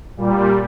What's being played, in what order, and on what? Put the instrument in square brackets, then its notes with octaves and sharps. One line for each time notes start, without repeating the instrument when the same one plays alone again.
[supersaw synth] A#2 G3